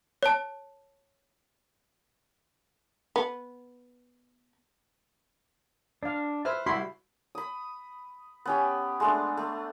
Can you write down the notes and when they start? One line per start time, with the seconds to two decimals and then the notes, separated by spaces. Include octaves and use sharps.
0.23 C#5 A5
3.16 B3
6.03 D4 D5 F5
6.45 B4 C5 E5 F6
6.66 C2 G3 E4 F#4 E5 B5 C6
7.35 B5 D#6
8.46 B3 C#4 G4
9.00 G#3 A3 D4
9.37 A3